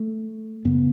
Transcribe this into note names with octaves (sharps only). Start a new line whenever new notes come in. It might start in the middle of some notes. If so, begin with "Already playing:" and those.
Already playing: A3
F#2 C#3 B3